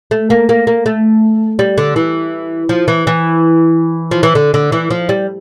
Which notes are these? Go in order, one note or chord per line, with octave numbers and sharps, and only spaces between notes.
A3
A#3
A#3
A#3
A3
G3
D3
E3
F3
E3
E3
F3
E3
D3
D3
E3
F3
G3